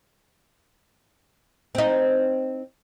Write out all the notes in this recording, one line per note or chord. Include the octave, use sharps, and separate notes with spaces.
C4 D#4